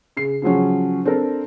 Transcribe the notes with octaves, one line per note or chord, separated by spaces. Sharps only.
C#3 C7
C#3 F3 F#3 C#4
C4 D4 A4 A#4